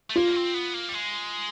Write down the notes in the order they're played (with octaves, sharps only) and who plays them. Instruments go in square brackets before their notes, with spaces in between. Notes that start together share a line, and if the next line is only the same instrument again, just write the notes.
[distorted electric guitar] A3
[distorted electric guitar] A#3 [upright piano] F4
[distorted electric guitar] C4
B3
A#3
G3
G#3